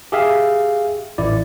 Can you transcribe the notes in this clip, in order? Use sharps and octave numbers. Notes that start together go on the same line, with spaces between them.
G4 G#4 E5 F5
A1 E4 D5